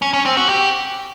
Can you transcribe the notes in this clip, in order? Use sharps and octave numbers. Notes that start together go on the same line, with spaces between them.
C#4
C#4
C4
F#4
G4